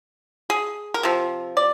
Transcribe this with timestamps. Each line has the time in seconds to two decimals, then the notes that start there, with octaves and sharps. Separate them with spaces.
0.50 G#4
0.94 A#4
1.03 C3 F3
1.57 D5